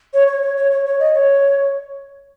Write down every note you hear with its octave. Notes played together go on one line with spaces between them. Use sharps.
C#5
C#5
C#5
C#5
C#5
C#5
D#5
C#5